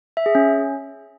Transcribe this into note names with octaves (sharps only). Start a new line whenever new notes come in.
E5
G#4
C#4